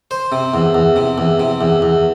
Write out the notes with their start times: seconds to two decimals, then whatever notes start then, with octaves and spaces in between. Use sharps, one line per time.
0.11 C5
0.32 C3
0.54 E2
0.75 E2
0.96 C3
1.18 E2
1.40 C3
1.61 E2
1.82 E2